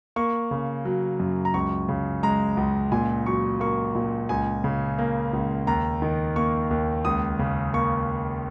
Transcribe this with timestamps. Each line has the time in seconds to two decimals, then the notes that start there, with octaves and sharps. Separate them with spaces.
0.16 A#3 C#6
0.51 C#3
0.85 F#3
1.20 F#2
1.45 A#5
1.54 C#2 C#6
1.89 C#3
2.23 G#3 A#5
2.57 C#2
2.92 A#2 G#5
3.26 F#3 C#6
3.60 A#3 C#6
3.95 A#2
4.29 C#2 G#5
4.64 C#3
4.98 A#3
5.33 C#2
5.67 D#2 A#5
6.02 D#3
6.36 A#3 C#6
6.71 D#2
7.05 C#2 D#6
7.39 C#3
7.73 A#3 C#6